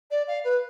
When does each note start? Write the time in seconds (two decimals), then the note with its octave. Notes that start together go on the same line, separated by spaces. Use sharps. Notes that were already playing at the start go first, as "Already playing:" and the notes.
0.11 D5
0.27 F5
0.44 B4